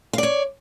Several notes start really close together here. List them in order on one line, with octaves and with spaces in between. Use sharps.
F5 D5 C#5